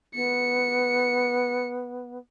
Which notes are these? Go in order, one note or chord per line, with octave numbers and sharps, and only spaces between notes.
B3 C#7